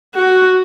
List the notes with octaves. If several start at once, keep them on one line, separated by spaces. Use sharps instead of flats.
F#4